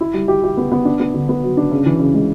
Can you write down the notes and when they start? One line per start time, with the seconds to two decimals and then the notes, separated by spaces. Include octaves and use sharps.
0.01 E4
0.14 G3
0.28 G4
0.43 G4
0.57 B3
0.72 B3
0.85 D4
1.00 B3
1.14 D3
1.29 B3
1.43 F#3
1.57 D4
1.71 C#3
1.86 E3
1.99 C#3
2.14 G#3